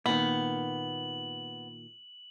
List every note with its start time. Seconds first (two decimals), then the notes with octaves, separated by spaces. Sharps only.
0.06 A#2 D#3 B3 F#7